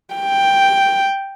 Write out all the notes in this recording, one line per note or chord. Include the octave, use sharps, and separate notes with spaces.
G5